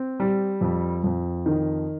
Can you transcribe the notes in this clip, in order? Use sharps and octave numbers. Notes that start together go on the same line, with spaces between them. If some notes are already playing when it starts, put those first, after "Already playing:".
Already playing: C4
G3
F2
F2
D#3